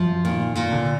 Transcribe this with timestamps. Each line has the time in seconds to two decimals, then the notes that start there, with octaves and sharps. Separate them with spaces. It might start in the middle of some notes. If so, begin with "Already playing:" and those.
Already playing: F#2 F3
0.24 A#2 D#3
0.55 A#2
0.72 D3